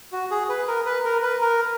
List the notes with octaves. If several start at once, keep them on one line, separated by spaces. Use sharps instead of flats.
F#4
G#4
B4
A#4
B4
A#4
B4
A#4